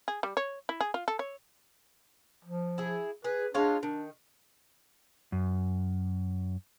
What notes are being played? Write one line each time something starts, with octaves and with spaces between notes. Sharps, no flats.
G#4
G3
C#5
E4
G#4
F4
A4
C#5
F3
E4 G#4
G#4 B4
G#3 D4 F4 C#5
D#3 D4
F#2